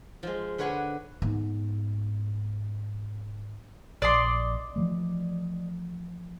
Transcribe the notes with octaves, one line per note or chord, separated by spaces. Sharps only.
F3 G#3
D3 B4 C#5 F#5 G#5
G#2 B3
A#1 D5 D#5 C6
E3 F3 A3